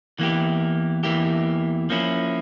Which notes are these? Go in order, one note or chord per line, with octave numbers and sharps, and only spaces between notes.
E2 E3 A#3 E4 G4
E2 E3 A#3 E4 G4
F3 A#3 C#4 E4